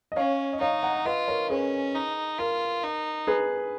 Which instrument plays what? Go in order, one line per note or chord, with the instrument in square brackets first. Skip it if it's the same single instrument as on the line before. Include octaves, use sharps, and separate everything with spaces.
[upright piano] D#5
[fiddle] C#4 [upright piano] C#5 F5
[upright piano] D#5
[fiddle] D#4 [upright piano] C#5 F5
[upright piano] F#5 A#5
[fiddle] F4 [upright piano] B4 D#5
[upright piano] A#4 C#5
[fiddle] C#4 [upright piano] G#4 B4
[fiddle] D#4
[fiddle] F4 [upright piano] A#4
[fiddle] D#4
[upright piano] G#4 B4